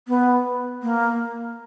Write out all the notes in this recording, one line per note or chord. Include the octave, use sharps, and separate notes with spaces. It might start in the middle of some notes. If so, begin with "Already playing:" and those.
B3
A#3